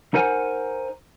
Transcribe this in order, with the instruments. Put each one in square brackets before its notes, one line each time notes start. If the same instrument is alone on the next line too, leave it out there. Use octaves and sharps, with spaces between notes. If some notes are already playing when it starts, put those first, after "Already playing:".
[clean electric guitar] D#4 A#4 C5 F#5 G#5